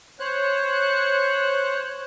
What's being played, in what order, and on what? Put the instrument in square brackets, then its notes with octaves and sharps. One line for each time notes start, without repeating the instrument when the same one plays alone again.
[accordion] C5 C#5 F#6